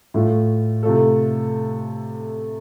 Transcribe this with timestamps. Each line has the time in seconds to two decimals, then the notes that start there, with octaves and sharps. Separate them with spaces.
0.14 A2 A3 F4
0.83 C3 A3 F4 A4